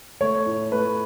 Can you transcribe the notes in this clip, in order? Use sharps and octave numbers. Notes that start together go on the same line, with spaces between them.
A3 C#5
A2
A3 B4